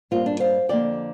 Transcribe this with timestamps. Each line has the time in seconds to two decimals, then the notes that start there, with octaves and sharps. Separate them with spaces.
0.11 G2 G3 A#3 C4 F4
0.26 D4
0.40 C5 F5
0.69 F2 D3 A#3 D5 G5